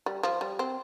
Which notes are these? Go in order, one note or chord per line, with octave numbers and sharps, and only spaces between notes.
G3
F3
G3
C4